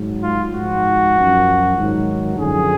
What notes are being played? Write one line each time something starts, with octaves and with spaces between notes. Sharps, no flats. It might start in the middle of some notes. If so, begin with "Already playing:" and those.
Already playing: G#2 F#3
F4
G#2 F3 F#4
F#2 F3
G#2 D#3 F#3
F#2 D3 F3 G#4